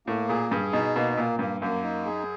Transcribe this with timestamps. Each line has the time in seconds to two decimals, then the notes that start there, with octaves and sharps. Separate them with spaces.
0.07 A2 A#3
0.28 A#2 G#4
0.51 G2 G#4
0.73 B2 D#4
0.96 B2 A#3
1.17 A#2 A#3
1.39 G2 A#3
1.61 F#2 A#3
1.83 D#4
2.05 G#4